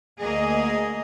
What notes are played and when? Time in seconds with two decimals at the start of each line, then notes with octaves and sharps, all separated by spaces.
0.20 D2 A#3 G#4 D#5